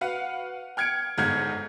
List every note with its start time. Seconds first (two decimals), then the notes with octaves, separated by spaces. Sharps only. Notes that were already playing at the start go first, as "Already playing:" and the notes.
0.01 F#4 B4 F5 F#5
0.77 G5 F6 G#6 C#7 D7
1.18 G1 G#2 F#5 F6 G6 G#6